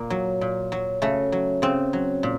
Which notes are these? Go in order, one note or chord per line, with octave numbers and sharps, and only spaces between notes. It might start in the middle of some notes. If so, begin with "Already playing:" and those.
Already playing: A#2 A#3
F#3
A#2
F#3
C#3 A3
F#3
C#3 C4
F#3
A#2